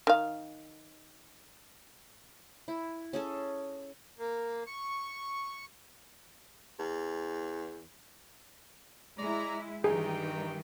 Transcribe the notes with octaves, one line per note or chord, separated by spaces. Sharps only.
D#3 F5
E4
C#4 G#4 A4
A#3
C#6
E2
G#3 E4 D5 A#5
G2 D#3 E3 G3 D#4 G#4 G5